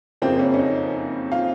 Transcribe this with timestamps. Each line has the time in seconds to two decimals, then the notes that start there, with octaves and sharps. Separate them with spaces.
0.22 F#1 F2 C#3 F3 A#3 C4
0.39 C#4
0.54 C#4
0.59 D#4
1.32 F4